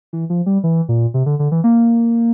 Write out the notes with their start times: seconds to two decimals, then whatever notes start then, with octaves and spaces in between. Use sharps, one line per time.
0.13 E3
0.30 F3
0.46 G3
0.64 E3
0.89 A#2
1.14 C3
1.26 D3
1.39 D3
1.52 E3
1.64 A#3